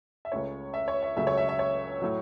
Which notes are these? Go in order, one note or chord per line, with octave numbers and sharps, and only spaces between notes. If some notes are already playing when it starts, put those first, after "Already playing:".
E5
C#2 C#3 A3 C#5
E5
C#5
E5
C#2 C#3 F#3 A3 E5
C#5
E5
E5
C#5
A2 F#3